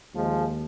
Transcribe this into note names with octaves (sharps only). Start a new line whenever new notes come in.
D#2 D#3 F3 G#3